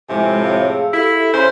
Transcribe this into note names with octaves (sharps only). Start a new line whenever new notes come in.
F2 A2 C3 G#3 G#5
C#5 F5 A5
G#4 F5 E6
E4 G4 A4
C#3 C5 C#5